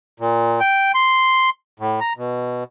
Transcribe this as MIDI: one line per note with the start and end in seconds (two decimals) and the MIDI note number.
0.20 0.60 46
0.60 0.92 79
0.95 1.50 84
1.79 2.00 45
2.00 2.13 82
2.17 2.64 47